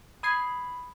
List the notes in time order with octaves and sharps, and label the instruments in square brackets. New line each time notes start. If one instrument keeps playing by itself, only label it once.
[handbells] B5 [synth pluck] D#6 G#6 C7